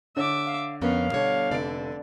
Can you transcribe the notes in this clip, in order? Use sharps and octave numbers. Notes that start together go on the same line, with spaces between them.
D3 C#5 E5 D6
F5
F2 B3 C#4 A#4 F5
B2 D3 G3 C#5
F1 D5 D7